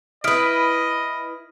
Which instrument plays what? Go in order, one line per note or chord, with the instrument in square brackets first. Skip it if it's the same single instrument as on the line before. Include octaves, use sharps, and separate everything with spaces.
[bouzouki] E4 B4 [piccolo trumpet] D#5 [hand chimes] D#6 F6 D7